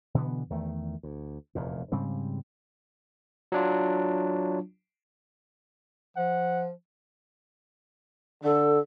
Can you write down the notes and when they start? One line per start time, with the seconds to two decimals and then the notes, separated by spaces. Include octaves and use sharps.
0.14 B2 D3 E3 B3
0.50 E2 D#3 A3
1.03 D2
1.55 F1 E2 A#2
1.92 G#2 C#3 G3 C4
3.52 F#3 D4 F4
6.17 F3 F#5
8.44 D3 A4